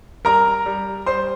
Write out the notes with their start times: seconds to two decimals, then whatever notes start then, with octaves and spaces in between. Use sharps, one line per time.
0.25 G3 A#4 A#5
0.66 G3
1.06 G3 C5 C6